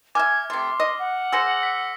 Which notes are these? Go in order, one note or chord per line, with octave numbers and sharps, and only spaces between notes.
E5 G#5 D6 F6 G#6
C3 A3 C6
D#5
F#5
G#4 C5 E6 A#6 C#7
B6